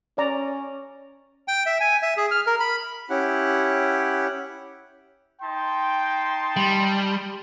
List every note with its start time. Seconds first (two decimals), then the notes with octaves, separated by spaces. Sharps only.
0.18 C#4 D5 A#5
1.48 G5
1.66 E5
1.80 G#5
2.02 E5
2.17 G#4
2.31 F6
2.47 A#4
2.60 B5
3.10 C#4 E4 G4 F#5
5.41 D#4 G5 A5 C6
6.56 G3